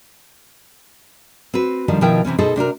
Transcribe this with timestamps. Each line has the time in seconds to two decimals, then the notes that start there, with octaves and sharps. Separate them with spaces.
1.54 C4 F#4 B4
1.88 D3 D#3 F3 G3
2.01 B2 D#3 F3 E4 A#4 G5
2.25 C3 E3 C4 C#4
2.39 B2 D#4 G#4 A4 C5 D#5
2.56 C3 D4 F#4 A#4